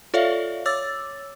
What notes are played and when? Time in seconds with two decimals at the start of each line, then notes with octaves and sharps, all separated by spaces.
0.14 F4 A4 C#5 D5 E5 F5
0.66 C#5 D6 E6 A6